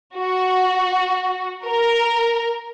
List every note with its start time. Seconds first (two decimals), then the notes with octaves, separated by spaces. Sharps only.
0.16 F#4
1.66 A#4